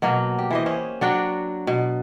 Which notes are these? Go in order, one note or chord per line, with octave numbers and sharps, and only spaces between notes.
B2 F#3 A#3
G4
E3 C5 D#5
C#4 C5 D#5
F#3 D4 F#4 G5
B2